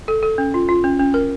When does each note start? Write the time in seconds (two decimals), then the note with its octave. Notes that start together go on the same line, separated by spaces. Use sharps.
0.08 A4
0.23 A4
0.38 C#4
0.54 F4
0.69 F4
0.84 C#4
1.00 C#4
1.14 A#4